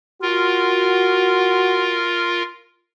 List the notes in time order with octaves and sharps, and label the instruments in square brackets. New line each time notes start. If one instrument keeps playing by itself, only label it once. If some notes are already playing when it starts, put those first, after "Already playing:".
[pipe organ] F4 A#4 [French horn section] F#4